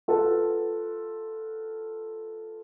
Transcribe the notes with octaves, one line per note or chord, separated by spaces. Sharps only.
F4 A4 B4 F#5 A5